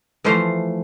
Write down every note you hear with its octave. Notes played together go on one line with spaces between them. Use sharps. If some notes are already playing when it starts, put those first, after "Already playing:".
E3 F3 A3 F4 C5